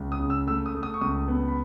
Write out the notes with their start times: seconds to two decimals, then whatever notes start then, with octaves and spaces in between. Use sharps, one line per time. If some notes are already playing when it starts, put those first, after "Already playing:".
Already playing: C#2
0.12 D#6
0.20 C#3
0.30 E6
0.47 A3 E6
0.66 D#6
0.75 A3
0.83 D#6
0.94 C#6
1.01 C#2 D#6
1.28 B3
1.48 B5